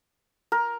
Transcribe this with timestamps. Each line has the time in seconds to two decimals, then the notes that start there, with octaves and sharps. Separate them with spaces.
0.52 A#4